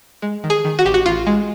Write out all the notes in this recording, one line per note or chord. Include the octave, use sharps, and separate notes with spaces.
G#3
D#3
G#4
D#3
F#4
A1 G4
F#4
A1 F4
G#3